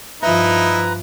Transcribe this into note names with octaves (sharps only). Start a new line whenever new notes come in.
G2 F3 D#4 E4 B4 E5 A#5